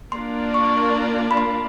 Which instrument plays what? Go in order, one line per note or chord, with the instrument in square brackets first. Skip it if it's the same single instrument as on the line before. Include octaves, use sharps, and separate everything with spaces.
[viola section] A#3 D4 F4 A#4 D5 [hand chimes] C6
[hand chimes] C#6
B5
C6